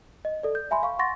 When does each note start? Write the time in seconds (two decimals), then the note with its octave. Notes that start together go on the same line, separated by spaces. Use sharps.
0.25 D#5
0.43 A4 D5
0.55 G6
0.71 E5 G#5 B5 C6
0.83 F5 C#6
0.99 F#5 C6 C#6 A6 A#6